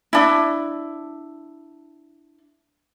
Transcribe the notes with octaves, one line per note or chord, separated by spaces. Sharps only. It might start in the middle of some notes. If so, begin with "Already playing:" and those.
D4 E4